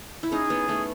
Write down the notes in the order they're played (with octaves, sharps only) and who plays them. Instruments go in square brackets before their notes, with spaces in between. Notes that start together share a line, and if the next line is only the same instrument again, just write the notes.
[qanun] E4
[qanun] C#4 D#4 [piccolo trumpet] G#4
[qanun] B3 C#4
A3 B3